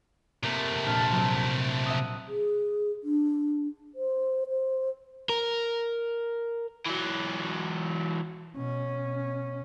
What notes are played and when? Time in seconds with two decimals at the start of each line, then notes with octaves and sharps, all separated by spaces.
0.43 C3 A3 A#3
0.86 A#1 A5 F6
1.12 F#3 C4
1.86 E5 F#5 D#6
2.27 G#4
3.04 D4
3.95 C5
4.47 C5
5.29 A#4
6.86 E3 F#3
8.56 B2 C#4